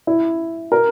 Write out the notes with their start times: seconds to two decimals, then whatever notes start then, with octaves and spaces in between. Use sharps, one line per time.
0.07 E4
0.72 A#4